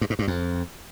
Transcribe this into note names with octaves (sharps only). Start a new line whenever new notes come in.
G2
G#2
G2
F2